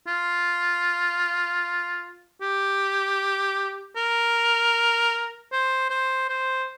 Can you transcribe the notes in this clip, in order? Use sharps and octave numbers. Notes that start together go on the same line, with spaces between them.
F4
G4
A#4
C5
C5
C5